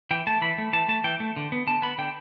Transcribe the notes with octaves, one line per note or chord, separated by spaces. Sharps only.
E3 G5
A3 A5
E3 B5
A3
E3 A5
A3 A5
E3 G5
A3
D3
B3
D3 A5
B3 B5
D3 G5